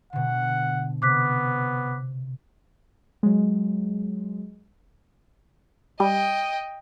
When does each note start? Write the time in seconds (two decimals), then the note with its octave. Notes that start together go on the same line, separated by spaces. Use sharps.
0.13 B2 D3 F#5
1.02 C3 B3 D6 F#6 B6
3.23 F#3 G#3
6.00 G3 D#5 G5